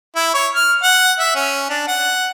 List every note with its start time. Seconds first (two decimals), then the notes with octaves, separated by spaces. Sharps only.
0.15 E4
0.34 C#5
0.55 F6
0.83 F#5
1.19 E5
1.35 C#4
1.69 D4
1.88 F#5